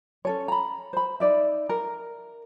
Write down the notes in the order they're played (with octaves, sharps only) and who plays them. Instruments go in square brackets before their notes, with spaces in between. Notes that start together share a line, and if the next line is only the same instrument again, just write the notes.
[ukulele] C#4 A4 C#5
A#5 B5
C5 B5
D#4 D5 E5
A#4